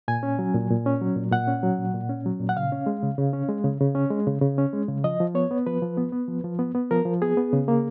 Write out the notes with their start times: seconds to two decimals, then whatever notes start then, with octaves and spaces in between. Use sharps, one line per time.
0.08 A#2 G#5
0.23 C#4
0.39 F#3
0.54 A#2
0.70 A#2
0.86 C#4
1.01 F#3
1.16 A#2
1.32 A#2 F#5
1.47 C#4
1.63 F#3
1.78 A#2
1.94 A#2
2.09 C#4
2.26 F#3
2.40 A#2
2.49 F#5
2.57 C#3 F5
2.72 C#4
2.86 G#3
3.03 C#3
3.18 C#3
3.33 C#4
3.48 G#3
3.65 C#3
3.81 C#3
3.95 C#4
4.11 G#3
4.27 C#3
4.42 C#3
4.58 C#4
4.73 G#3
4.88 C#3
5.04 F3 D#5
5.20 F3
5.35 B3 C#5
5.51 B3
5.66 F3 B4
5.82 F3
5.97 B3
6.12 B3
6.28 F3
6.44 F3
6.59 B3
6.75 B3
6.91 F3 A#4
7.05 F3
7.22 B3 G#4
7.37 B3
7.53 C#3
7.68 A#3